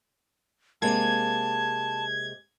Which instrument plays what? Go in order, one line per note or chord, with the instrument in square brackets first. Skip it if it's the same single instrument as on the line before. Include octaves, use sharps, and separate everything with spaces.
[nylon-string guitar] C3 G#3 A#3 [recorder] A5 [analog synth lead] G#6